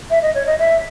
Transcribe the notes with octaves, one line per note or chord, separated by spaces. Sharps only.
E5
D#5
C#5
D#5
E5